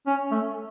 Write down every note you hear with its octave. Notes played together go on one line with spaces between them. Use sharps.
C#4
A3